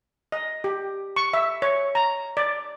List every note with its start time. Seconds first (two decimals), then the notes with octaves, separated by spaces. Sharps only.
0.32 D#5
0.64 G4
1.16 C#6
1.33 E5
1.62 C#5
1.95 A#5
2.37 D5